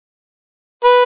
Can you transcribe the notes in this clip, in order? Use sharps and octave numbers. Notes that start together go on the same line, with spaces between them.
B4